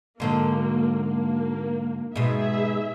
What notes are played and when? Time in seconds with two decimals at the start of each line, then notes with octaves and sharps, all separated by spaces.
0.20 G#2 D3 F#3 A#3
1.07 A#3
2.16 G#2 B2 G#4 E5